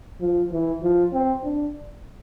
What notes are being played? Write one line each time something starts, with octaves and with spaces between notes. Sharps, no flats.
F3
E3
F3
C4
D4